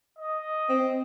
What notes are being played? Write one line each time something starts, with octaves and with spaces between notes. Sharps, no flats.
D#5
C4